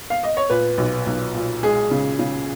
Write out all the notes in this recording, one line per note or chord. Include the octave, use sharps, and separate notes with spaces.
F5
D#5
C#5
A#2 B4
B1
B1
A#2
G#3 G#4
C#3
C#3